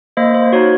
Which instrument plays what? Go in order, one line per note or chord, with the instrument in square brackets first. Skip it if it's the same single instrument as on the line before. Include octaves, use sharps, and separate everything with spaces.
[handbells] A#3 C5 D#5
C5
D#4 F#4 C#5